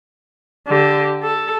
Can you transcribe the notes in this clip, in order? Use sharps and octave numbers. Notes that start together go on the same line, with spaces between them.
D3 G4
A4